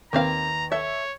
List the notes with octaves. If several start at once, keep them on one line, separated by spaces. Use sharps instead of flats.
D#2 A#3 C4 B4 F5 A#5
A4 C#5 E5